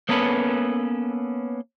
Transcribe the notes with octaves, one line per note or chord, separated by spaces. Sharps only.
A#3 B3 C#4 A4 B4